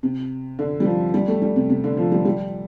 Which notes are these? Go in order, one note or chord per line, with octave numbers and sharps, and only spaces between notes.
C3
D3
G3
F3
G3
A3
G3
C3
C3
D3
F3
G3
G3